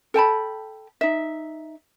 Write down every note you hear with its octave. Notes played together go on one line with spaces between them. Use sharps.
A4 G5 A5 B5
D#4 E5